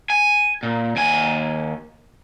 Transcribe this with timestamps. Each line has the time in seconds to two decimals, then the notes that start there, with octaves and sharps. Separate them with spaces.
0.10 G#5
0.63 A#2
0.96 D#2 G#5